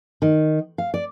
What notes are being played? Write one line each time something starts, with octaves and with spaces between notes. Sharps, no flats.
D#3
F5
D5